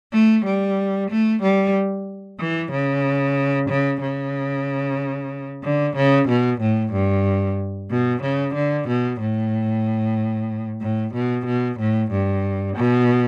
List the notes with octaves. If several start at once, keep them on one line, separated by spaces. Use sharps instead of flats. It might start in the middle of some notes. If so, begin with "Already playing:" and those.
A3
G3
A3
G3
E3
C#3
C#3
C#3
D3
C#3
B2
A2
G2
B2
C#3
D3
B2
A2
A2
B2
B2
A2
G2
B2